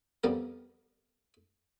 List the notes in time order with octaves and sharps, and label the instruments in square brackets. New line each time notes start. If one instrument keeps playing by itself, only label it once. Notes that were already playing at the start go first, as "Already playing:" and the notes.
[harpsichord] F2 G3 B3 A#4